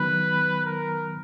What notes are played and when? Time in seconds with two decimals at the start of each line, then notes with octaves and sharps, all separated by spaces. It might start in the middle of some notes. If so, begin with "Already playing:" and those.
Already playing: D#3 F#3 B3 B4
0.65 A#4